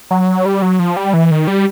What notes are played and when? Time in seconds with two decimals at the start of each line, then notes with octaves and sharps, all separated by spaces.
0.11 F#3
0.46 G3
0.62 F#3
0.79 F3
0.97 G3
1.14 E3
1.31 D#3
1.48 G3